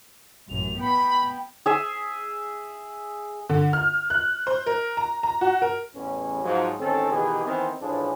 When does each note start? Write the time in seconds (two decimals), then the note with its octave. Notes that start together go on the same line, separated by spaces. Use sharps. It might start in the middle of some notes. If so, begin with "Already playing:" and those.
0.49 A1 F#2 F7
0.80 B3 G5 B5
1.66 G#4 E5
3.49 D3
3.73 F6
4.10 F#6
4.47 C5
4.66 A#4
4.97 A#5
5.23 A#5
5.41 F#4
5.62 A#4
5.94 A1 E2 C#4
6.44 G#2 F3 F#3
6.79 A1 D#3 C4 C#4 A4
7.12 B2 D#3 E3 G4 G#4
7.45 D#3 E3 B3 C4
7.81 A1 A2 E3 F3 D4 G#4